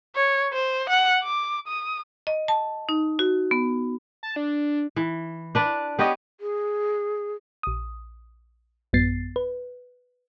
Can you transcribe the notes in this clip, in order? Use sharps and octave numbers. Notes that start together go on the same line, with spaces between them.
C#5
C5
F#5
D6
D#6
D#5
A5
D#4
F#4
B3
A5
D4
E3
D4 B4 D5
B3 G4 C#5 D#5
G#4
A#1 D#6
A1 F#2 B3 A6 C7
B4